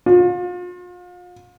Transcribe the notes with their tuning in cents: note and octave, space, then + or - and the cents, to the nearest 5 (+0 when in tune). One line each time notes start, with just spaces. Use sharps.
F4 +35